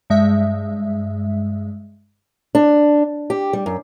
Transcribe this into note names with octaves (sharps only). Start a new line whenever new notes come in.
G2 G#3 E5
D4
G4
G3
F#2